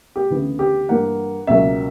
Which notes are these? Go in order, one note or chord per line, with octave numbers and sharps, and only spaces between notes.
G4
D2 C#3 E3 B3
G4
G2 E3 A#3 F#5
C#2 B2 F#3 A#3 C#4 E5